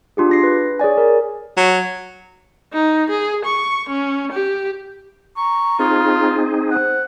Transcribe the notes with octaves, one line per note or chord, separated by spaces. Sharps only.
D4 F4 G4 G#4
D4 A#6 C7
B4
G#4 C#5 D5 G#5
A#4
F#3
D#4
G#4
C#6
C#4
G4
A#5 C#6
C4 D#4 F4 G#4
C5 F#5